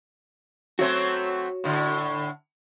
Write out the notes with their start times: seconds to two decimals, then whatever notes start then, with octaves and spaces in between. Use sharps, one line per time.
0.79 F#3 A3 C4 F#4 C#5
1.64 A2 D3